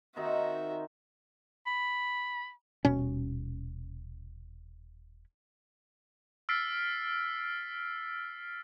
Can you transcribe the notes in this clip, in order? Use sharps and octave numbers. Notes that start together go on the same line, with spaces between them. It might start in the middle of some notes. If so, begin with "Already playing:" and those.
D#3 C4 D#4 F#4 E5
B5
D#1 B2 C#4
E6 F6 A6 B6 C7 D7